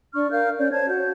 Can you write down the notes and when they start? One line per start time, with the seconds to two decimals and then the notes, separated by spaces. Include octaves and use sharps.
0.14 D4 D5 C#6 F6
0.31 A#4 F5 F6 G6
0.59 C#4 C#5 D5 G6
0.72 C5 C#5 A5 G#6
0.88 F#4 G6